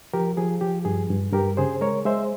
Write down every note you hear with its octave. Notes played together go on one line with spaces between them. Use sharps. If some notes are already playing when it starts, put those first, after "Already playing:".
F3 G4 A#4
F3 G#4
F3 G4
G2 G#4
G2
G2 G4 A#4
C#3 G#4 C5
G#3 A#4 C#5
G#3 C5 E5